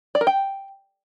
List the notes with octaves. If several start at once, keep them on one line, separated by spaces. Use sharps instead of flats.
D5
A#4
G5